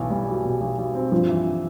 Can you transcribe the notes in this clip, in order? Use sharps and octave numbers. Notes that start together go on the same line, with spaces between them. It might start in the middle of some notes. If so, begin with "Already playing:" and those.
Already playing: B1 B2 E3
G3
B1
B2
B1
B1
C4
G2 F3
E3